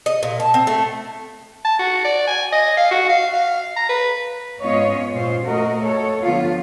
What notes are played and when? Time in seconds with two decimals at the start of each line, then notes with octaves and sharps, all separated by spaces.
0.06 D#5
0.23 A#2
0.40 A5
0.54 C4
0.67 A3
1.65 A5
1.79 F#4
2.05 D5
2.28 G#5
2.53 D#5
2.77 F5
2.91 F#4
3.09 F5
3.33 F5
3.77 A#5
3.90 B4
4.62 G#2 B3 C#4 F4 C#5 D#5
5.15 A#2 F4 C5
5.46 A3 F#4 A#4 D#5
5.82 A4 C#5
6.23 D3 F3 B3 F4